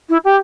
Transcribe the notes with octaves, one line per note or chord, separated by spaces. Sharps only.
E4
G4